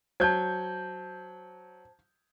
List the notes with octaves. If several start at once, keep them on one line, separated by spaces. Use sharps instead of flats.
F#3 C5 A5 G6 G#6